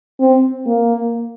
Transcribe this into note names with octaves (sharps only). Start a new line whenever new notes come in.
C4
A#3